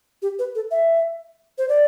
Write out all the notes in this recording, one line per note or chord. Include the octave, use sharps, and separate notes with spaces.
G4
B4
A4
E5
C5
D5